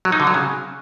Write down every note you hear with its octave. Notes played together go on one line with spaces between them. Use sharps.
F#3
D#4
D3
F#3
C#3